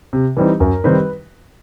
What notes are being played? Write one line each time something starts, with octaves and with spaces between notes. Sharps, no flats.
C3
E3 G3 C4 D#4
F#2 A#4
D#3 G3 C4 D#4 B4